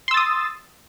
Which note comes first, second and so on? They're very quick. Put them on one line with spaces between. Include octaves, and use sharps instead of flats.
C6 E6 A6 D#6